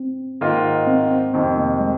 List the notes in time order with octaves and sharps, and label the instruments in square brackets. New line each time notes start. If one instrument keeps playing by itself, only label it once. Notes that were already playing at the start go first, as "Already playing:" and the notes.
Already playing: [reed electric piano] C4
[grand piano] G#2 D#3 A#3 F4
[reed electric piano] C4
C4
[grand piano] F2 C3 D#3 [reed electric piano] C4
[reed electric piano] A#3
G#3